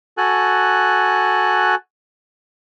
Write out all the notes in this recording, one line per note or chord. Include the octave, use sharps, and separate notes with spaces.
F#4 A4 G#5 F#6